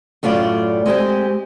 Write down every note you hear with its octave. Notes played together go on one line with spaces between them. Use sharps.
F#2 A2 C#4 F4 D5
G#3 C4 G4 G#4